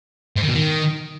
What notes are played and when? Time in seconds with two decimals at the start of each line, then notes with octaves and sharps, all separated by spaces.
0.36 G#2
0.42 D#3
0.48 B2
0.54 D#3